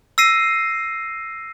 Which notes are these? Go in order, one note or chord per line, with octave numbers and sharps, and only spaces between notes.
E6 A#6 C7 D#7